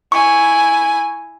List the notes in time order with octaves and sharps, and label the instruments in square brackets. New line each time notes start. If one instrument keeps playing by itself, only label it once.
[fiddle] E4 G#5 [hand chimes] C#6